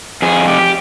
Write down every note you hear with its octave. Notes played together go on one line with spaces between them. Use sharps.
F2 G#4
G4